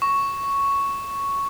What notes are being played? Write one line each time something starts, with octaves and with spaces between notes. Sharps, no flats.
C#6